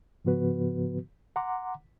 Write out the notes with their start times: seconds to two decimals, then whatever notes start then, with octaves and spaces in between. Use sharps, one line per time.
0.25 G#2 C#3 F3 B3 F#4 B4
1.36 F#5 A#5 C6 D6